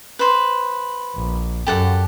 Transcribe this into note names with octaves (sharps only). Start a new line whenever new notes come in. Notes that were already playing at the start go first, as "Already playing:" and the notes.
B4 C5
A#1
F#2 G4 A4 F#5